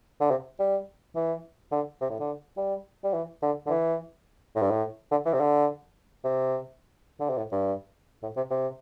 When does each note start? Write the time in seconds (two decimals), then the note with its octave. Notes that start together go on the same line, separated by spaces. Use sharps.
0.21 D3
0.31 C3
0.59 G3
1.16 E3
1.72 D3
2.01 C3
2.10 A2
2.20 D3
2.57 G3
3.04 G3
3.14 E3
3.42 D3
3.66 D3
3.70 E3
4.56 A2
4.62 G2
4.71 A2
5.11 D3
5.26 E3
5.33 C3
5.40 D3
6.24 C3
7.20 D3
7.30 C3
7.37 A2
7.52 G2
8.23 A2
8.37 C3
8.50 C3